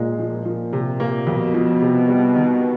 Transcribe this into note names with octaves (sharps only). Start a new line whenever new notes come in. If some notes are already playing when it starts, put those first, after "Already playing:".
Already playing: A#2 G#3
F3
A#2 F3
C3
A#3
F2 B2
F3
C3
G3
D#3
B3